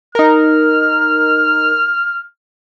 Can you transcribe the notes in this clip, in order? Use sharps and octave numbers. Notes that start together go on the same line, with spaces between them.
D#4 A#4 F6